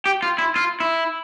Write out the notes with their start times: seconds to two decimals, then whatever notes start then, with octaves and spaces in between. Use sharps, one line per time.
0.06 G4
0.22 F4
0.38 E4
0.56 F4
0.80 E4